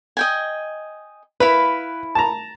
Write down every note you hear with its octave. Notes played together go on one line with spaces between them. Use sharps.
D#5 G5 G#5
E4 B4 F5 B5
A5 A#5